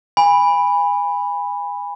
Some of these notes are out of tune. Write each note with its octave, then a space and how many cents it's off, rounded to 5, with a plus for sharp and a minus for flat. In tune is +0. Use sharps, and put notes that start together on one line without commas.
G#5 -30 B5 +0